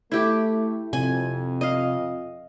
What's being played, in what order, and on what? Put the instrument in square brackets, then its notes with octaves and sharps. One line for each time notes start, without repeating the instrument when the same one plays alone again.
[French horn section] A3 [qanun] E4 G4
[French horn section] F2 [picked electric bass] C3 [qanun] G#5
[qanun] D#5 F5